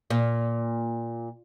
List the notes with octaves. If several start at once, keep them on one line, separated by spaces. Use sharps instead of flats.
A#2